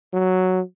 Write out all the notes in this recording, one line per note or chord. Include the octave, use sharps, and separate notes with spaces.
F#3